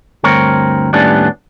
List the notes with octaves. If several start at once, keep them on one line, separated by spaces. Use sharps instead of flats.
D2 G2 C4 A#4 C#5
D#2 A2 G3 B3 C#4 D4